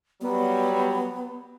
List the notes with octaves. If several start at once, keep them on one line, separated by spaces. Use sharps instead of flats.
F#3 G3 B3